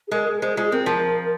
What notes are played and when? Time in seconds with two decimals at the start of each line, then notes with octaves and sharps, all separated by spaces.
0.08 G#4
0.11 G#3 A#4
0.26 G#4
0.41 G#3 C5
0.57 G#3 F4
0.66 G#4
0.72 C4 A#4
0.86 F3